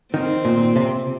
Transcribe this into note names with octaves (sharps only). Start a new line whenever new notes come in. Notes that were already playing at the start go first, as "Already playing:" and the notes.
D#3 C4
A#2
C3